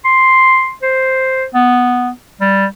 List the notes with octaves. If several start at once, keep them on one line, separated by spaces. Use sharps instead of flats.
C6
C5
B3
G3